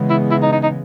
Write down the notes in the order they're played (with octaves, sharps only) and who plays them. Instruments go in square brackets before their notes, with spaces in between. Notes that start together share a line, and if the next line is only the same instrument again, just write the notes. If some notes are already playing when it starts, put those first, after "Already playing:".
Already playing: [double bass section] C#3 E3 G#3 B3
[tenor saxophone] E4
E4
D#4
D#4
D#4